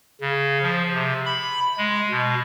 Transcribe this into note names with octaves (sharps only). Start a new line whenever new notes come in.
C#3
F3
C3
B5
G#3
B2